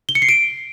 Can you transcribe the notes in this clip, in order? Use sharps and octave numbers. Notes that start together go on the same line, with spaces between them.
G7
C#7
C7
D7